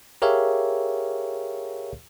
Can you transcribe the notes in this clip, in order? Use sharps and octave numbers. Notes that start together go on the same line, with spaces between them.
G4 G#4 A#4 C#5 E5 F5